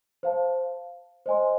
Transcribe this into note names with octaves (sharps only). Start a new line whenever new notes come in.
C5 F5 A5
C5 D#5 G#5 C6